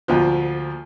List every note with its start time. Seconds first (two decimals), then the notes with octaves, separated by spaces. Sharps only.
0.08 D2 A#2 F3